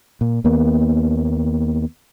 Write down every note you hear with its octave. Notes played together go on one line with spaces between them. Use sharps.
A#2
D#2 A#3 B3